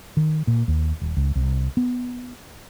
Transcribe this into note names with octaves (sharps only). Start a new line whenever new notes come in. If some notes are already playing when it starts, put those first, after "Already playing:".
D#3
A#2
D#2
D#1
C#2
C2
B3